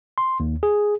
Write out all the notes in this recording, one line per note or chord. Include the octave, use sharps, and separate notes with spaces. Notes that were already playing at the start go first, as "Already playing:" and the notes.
C6
D#2
G#4